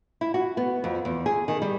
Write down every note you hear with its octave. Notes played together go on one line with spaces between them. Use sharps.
E4
F#4
B3
F2
E2
G#4
D#3
G3